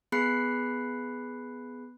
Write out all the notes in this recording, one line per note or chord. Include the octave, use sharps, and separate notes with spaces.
B3 G#4 B5 F#6 C7 C#7